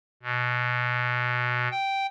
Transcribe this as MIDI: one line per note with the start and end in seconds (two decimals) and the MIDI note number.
0.23 1.68 47
1.72 2.07 79